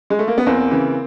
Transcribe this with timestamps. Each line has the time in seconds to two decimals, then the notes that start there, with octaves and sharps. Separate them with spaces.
0.10 G#3
0.19 A3
0.28 A#3
0.38 B3
0.47 E2 A#3 C4
0.71 C#3 E3